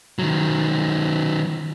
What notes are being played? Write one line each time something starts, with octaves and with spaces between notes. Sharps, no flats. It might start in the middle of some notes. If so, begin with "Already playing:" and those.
D#3 F#3